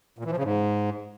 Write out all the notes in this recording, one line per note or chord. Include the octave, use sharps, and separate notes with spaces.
A#2
E3
F3
C#3
G#2